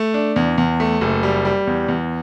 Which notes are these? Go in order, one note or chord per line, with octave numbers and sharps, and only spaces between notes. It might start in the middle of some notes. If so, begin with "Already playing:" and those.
Already playing: A3
D4
E2
E2
A3
F#1
G3
G3
E2
E2